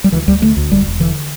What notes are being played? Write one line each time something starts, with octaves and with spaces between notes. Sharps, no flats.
G3
D2 E3
D2 G3
D3 A3
D2
E1 G3
E1
D3 E3